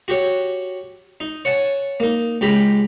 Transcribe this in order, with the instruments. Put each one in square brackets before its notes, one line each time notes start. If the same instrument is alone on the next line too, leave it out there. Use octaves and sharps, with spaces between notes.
[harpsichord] F#4 G4 C#5
D#4
C#5 F#5 G#5 A5
A#3 D#4
C#2 G4 A#5 B5